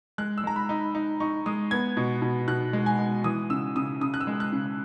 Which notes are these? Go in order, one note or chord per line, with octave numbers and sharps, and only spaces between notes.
G#3 F#6
E6
G#3 A#5
B5
D#4
D#4
D#4 C#6
G#3 D#6
B3 G#6
B2
B2
B2 F#6
G#3
G#5
G#3
E3 D#6
C#3 E6
C#3 D#6
C#3 D#6
F#6
E6
G#3
F#6
C#3